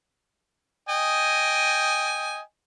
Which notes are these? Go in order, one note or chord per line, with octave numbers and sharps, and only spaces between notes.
D#5 G5 G#5